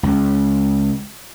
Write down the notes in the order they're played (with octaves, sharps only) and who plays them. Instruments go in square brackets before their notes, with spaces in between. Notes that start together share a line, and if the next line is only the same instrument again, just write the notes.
[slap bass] C#2